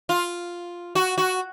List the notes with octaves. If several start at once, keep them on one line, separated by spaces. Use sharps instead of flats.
F4
F#4
F#4